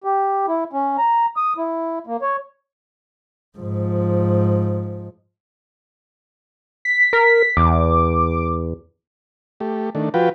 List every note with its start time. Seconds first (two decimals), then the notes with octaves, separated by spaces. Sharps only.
0.04 G4
0.47 E4
0.73 C#4
0.98 A#5
1.37 D#6
1.57 E4
2.07 A#3
2.22 C#5
3.58 G#2 F3
6.85 B6
7.13 A#4
7.57 E2 D6
9.60 A3 G4
9.95 D#3 A3 D4
10.14 F3 F4 F#4 B4 G5